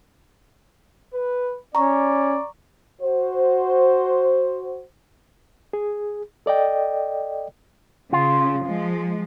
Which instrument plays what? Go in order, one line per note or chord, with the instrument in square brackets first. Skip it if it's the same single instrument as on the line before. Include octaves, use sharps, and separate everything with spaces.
[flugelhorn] B4
[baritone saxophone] C#4 [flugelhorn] D5 [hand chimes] A#5 C#6
[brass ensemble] F#4 C5
[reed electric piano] G#4
A4 D5 D#5 G5
[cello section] C#3 [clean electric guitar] F4
[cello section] F3 G#3